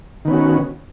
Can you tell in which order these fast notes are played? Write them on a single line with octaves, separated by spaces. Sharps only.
D#3 B3 C#4 F#4